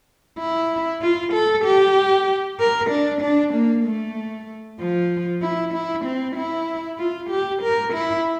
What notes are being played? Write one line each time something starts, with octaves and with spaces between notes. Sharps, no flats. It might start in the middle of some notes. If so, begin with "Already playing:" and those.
E4
F4
A4
G4
A#4
D4
D4
A#3
A3
F3
E4
E4
C4
E4
F4
G4
A#4
E4